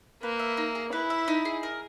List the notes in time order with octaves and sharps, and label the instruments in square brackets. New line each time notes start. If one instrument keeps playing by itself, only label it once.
[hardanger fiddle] A#3 [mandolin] B4
[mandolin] E5
D#4
G#4
[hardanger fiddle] E4 [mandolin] B4
[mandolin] E5
D#4
G#4
A#4